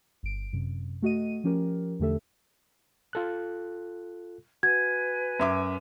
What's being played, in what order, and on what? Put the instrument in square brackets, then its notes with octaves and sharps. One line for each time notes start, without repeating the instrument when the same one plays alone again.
[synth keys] G1 D7
F#2 C3
A3 F#4 D#5 D#7
F3 C#4 G4 A#4
E2 D3 A3 G4 A4 E5
[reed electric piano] F4 A4 F#6
[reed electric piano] F#4 [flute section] B4 G#5 [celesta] G#6
[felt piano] F#2 E5 D6